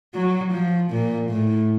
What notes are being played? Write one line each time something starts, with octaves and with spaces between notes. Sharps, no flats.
F#3
F3
A#2
A2